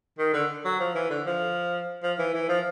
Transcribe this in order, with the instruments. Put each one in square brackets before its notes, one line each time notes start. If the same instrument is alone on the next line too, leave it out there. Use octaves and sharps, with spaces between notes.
[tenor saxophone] D#3
D3
F#3
F3
E3
D3
F3
F3
E3
E3
F3